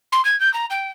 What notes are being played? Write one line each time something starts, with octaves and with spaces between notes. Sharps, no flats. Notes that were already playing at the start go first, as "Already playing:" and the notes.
C6
G#6
G6
A#5
G5